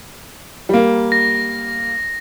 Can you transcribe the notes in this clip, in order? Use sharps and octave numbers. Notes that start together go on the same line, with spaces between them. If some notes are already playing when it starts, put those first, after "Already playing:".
G3 A#3
A#6